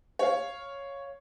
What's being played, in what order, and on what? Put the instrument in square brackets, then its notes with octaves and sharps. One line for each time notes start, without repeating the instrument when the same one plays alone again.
[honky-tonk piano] C#5 F5